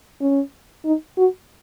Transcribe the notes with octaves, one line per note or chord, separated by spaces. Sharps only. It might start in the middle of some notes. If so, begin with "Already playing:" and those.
C#4
D#4
F#4